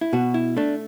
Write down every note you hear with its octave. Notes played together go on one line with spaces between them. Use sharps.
E4
B2 F#4
E4
A3 D4